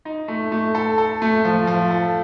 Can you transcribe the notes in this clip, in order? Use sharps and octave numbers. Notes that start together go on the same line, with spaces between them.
D#4
A3
A3
A4
A4
A3
F3
F3
A4